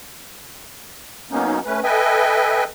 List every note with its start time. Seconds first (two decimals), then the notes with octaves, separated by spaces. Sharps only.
1.31 F#3 A#3 B3 C#4 D#4
1.66 A3 C#4 B4
1.83 A4 B4 D#5 E5 G5 G#5